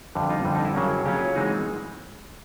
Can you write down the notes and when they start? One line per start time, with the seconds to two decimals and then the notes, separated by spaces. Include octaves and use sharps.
0.15 F2 D3 G3
0.30 D#4 F4
0.45 F2 D3 G3
0.55 D#4 F4
0.65 E4
0.75 C#3 F#3 A#3 C#4
1.05 C#3 F#3 A#3 C#4 F4 G4
1.35 E3 G#3 C4 D#4 F#4 G#4